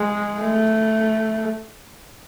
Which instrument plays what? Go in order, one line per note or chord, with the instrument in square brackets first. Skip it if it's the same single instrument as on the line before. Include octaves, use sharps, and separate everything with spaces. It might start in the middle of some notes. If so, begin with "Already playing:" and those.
Already playing: [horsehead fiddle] G#3
A3